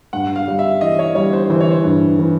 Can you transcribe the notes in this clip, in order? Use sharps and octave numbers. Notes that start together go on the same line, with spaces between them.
G2 F#5
F5
G3
E5
E3 D#5
C#5
G3 C#5
C5
E3 C5
C#5
C5
G2
E3